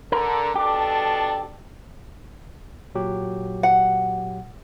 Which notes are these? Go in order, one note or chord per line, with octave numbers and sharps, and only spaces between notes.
D3 A#4
B2 D4 G4 A4
A#2 F#3 G4
F#5